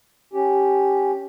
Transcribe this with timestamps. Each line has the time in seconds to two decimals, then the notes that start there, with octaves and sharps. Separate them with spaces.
0.33 C#4 G4